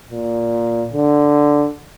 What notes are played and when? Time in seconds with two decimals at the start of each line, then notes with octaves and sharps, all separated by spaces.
0.10 A#2
0.93 D3